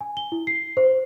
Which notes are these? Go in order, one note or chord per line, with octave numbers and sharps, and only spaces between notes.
G#5
G7
E4
C7
C5